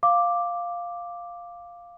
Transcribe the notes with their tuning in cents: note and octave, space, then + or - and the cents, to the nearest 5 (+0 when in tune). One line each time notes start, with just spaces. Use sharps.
F5 +0 D6 +0